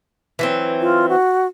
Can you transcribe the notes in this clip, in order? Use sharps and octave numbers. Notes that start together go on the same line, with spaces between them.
E3 F#3 C4
F4
F#4